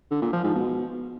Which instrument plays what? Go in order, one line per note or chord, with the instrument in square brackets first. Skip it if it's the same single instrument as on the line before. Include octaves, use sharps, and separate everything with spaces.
[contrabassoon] D3
A#2
F3
G#2
B2